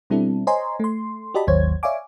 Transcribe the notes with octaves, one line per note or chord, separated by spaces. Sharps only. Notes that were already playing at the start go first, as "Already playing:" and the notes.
B2 G3 C4 D4 E4 A4
C5 C#5 D#5 G#5 A#5 C6
A3 C6
F#4 G4 D5 D#5 A5 B5
G#1 D#2 F#3 C5 C#5 G#6
C#5 D5 E5 F5 G#5 D6